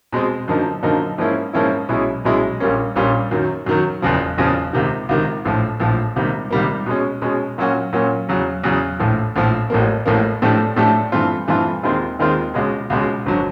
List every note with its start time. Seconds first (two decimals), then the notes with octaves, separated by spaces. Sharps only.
0.12 B2 G#3 C4
0.48 F#2 D3 F3 A#3 D#4
0.83 F#2 D3 F3 A#3 D#4
1.18 G#2 F3 A#3 C#4 E4
1.53 G#2 F3 A#3 C#4 E4
1.89 B1 B2 G#3 C#4 E4
2.25 B1 B2 G#3 C#4 E4
2.60 A#1 A#2 G3 A#3 C#4
2.96 A#1 A#2 G3 A#3 C#4
3.31 F#2 D#3 F#3
3.66 F#2 D#3 F#3
4.02 F#1 E2 C#3 F3
4.38 F#1 E2 C#3 F3
4.73 C#2 C3 D#3
5.09 C#2 C3 D#3
5.45 A#1 A2 F3
5.80 A#1 A2 F3
6.16 C#2 C3 D#3 G3 A#3
6.51 C#2 C3 D#3 G3 A#3
6.86 B2 G#3 C#4
7.22 B2 G#3 C#4
7.58 A#2 F#3 A#3 C#4 F#4
7.93 A#2 F#3 A#3 C#4 F#4
8.29 E2 C#3 F#3
8.64 E2 C#3 F#3
8.99 A#1 A2 F3
9.36 A#1 A2 F3
9.70 A1 A2 F3 A#3
10.06 A1 A2 F3 A#3
10.42 A2 F3 A3 D4 G4
10.76 A2 F3 A3 D4 G4
11.12 G2 E3 A3 C4 F4
11.48 G2 E3 A3 C4 F4
11.83 D#2 D#3 G#3 C4 F4
12.19 D#2 D#3 G#3 C4 F4
12.54 C#2 B2 G#3 C#4
12.90 C#2 B2 G#3 C#4
13.26 G#1 D3 F#3